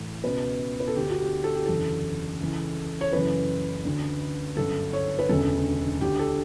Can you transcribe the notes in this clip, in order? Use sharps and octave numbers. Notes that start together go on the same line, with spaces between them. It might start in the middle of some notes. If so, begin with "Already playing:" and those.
Already playing: A2 E3
C#2 B2 B4
B4
A4
D2 D3 G4
F#4
G4
A4
G4
F#1 E2 D3 A4
C#2 C#3 E3
C#5
F#1 F#2 C#3 E3 B4
D2 D3
G1 F#2 D3 A4
C#5
B4
E1 D2 C#3 A4
D2 D3 G4
A4